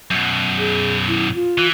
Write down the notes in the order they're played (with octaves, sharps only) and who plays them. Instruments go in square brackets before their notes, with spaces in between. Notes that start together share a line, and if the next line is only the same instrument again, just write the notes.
[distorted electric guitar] F#2 B2
[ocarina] G#4
E4
F4
[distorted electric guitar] E3